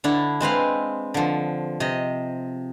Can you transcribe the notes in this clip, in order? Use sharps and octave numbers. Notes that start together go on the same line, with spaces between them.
D3 D4 E4
G#3 C4 B4 F5
D3 F3
C3 D#5